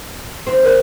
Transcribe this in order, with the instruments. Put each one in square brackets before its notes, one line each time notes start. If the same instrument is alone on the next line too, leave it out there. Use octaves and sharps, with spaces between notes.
[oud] D#2 C4
[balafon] A#4 C5